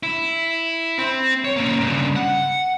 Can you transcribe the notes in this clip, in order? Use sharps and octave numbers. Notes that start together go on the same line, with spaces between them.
E4
C4
C#5
A#3 C#4
G2 C#3
F#5